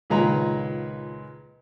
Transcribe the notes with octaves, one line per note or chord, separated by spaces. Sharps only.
C#2 A#2 D#3 G#3 B4 A#5